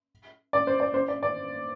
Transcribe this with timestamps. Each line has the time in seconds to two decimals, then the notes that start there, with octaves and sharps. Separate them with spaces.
0.53 D5
0.67 C5
0.80 D5
0.94 C5
1.08 D5
1.23 D5